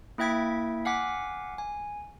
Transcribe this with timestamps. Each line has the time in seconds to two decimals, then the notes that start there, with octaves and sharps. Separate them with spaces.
0.18 A#3 E4 E5 G5 G#6 B6
0.85 F5 F#5 G#5 D6 B6
1.58 G#5